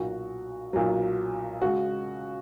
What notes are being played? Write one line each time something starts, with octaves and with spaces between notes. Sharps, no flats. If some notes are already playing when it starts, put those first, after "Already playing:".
Already playing: B1 A#2 F#3 F#4
B1 A#2 F#3
C#3 G#3 F#4